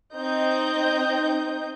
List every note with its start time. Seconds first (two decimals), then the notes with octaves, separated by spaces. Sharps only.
0.16 C4 D#4 D#5 G6